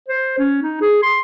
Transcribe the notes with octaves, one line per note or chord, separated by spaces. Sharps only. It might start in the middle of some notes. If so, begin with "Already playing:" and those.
C5
C#4
D#4
G#4
C6